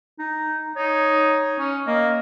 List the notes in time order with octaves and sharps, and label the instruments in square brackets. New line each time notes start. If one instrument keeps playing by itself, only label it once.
[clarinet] D#4
[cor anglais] D#4 [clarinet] C#5
[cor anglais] C#4
[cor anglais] A#3 [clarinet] D#5